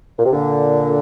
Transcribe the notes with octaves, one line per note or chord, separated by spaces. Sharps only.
A#2
C3
A#2 D3